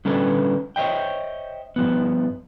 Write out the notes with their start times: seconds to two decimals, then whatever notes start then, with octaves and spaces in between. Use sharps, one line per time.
0.05 D3 G3 C#4 A4 B4
0.76 C5 C#5 D#5 E5 G5
1.76 G2 F3 B3